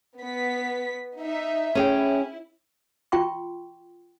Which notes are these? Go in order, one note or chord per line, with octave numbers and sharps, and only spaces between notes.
B3 B6
D#4 E5
C#4 E4 G#4 G5
F4 G5 C6 C#6